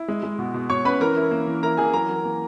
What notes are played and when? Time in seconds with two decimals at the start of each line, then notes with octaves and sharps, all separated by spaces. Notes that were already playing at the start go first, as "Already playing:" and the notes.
Already playing: E4
0.08 G#3
0.23 G#3
0.39 B2
0.54 B2
0.70 B2 C#5 C#6
0.85 C#4 B4 B5
1.00 E3 A#4 A#5
1.16 E4
1.31 A#3
1.47 E3
1.62 E4 A#4 A#5
1.77 E3 G#4 G#5
1.93 F#3 A#4 A#5
2.09 F#3
2.24 A#3